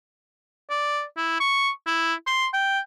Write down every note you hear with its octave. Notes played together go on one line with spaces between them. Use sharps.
D5
E4
C#6
E4
C6
G5